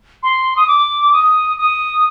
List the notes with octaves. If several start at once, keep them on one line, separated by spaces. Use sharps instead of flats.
C6
D#6
D6
D#6
D#6